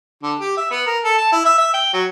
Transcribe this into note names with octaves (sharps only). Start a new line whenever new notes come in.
D3
G4
E5
B3
A#4
A4
A5
E4
E5
E5
G5
F#3